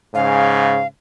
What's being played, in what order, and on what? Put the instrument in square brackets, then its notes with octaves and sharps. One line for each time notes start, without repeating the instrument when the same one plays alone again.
[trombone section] G#2 C#3 [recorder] F5